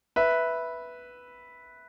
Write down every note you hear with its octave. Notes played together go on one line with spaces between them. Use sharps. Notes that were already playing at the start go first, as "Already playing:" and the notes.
B4 E5